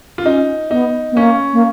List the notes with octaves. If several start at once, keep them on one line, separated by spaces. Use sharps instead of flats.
F4
C#4 D#4
B3 D#4
B3
A#3 C#4
A#3